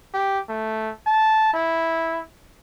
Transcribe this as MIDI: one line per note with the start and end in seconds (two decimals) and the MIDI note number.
0.14 0.39 67
0.49 0.91 57
1.07 1.51 81
1.54 2.21 64